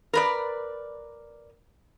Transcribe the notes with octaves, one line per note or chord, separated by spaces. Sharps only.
A#4 B4 D5